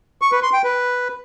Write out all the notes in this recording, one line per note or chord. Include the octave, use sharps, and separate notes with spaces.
C#6
B4
C6
G5
B4